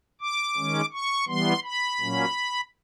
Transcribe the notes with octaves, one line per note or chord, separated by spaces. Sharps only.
D6
D#3 G#3 C#4
C#6
E3 G3 B3 C6
B5
A#2 F#3 A#3 C#4